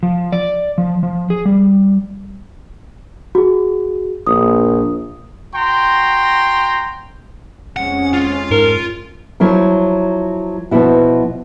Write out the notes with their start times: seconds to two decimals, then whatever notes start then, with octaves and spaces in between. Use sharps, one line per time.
0.03 F3
0.32 D5
0.78 F3
1.03 F3
1.30 G#4
1.45 G3
3.35 F#4 G#4
4.27 A#1 D#6
5.55 F#4 G5 A#5 C6
7.76 F2 G#3 C#4 F#5
8.13 F4
8.51 G#2 A#4
9.40 F3 F#3 E4 A#4
10.71 B2 F3 B3 E4 F#4